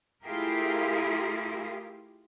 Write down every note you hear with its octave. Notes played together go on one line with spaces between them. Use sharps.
A3 E4 F4 G4 G#4 A#4